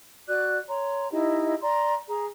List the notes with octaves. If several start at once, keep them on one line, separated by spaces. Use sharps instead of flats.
F#4 D5 D6 F#6
C#5 A#5 C6
D#4 E4 G4 D#5
D5 A#5 C6
G#4 A#5